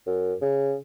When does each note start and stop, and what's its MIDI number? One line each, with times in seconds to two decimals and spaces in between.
0.07 0.34 42
0.42 0.76 49